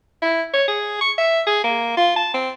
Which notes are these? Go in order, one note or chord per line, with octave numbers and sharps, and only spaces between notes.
E4
C#5
G#4
C#6
E5
G#4
A#3
F4
A5
C4